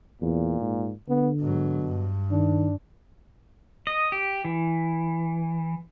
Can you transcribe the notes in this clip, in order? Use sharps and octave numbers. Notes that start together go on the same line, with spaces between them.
E2 A#2
G#2
D3 B3
G#2 B2 F#3
G2
D#3 D4
D#5
G4
E3